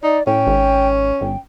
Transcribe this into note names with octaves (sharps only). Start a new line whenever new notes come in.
D#4 D5
A2 C#4 G5
G#1
G1 G5